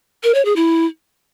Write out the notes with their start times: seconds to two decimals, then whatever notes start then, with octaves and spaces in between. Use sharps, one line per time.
0.24 A#4
0.34 C#5
0.45 G#4
0.56 E4